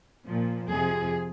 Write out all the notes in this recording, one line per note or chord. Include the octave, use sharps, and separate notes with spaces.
A#2 F3
F2 C3 F3 G#4